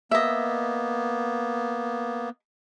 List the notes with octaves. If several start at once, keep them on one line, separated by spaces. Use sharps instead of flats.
A#3 B3 D#5 E5